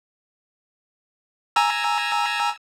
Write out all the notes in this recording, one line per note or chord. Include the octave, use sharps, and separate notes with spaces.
G#5 A#5 E6